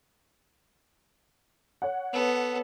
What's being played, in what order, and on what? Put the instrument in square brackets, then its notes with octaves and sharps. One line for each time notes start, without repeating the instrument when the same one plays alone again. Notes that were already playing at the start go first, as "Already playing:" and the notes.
[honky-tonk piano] C#5 F#5
[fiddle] B3 A4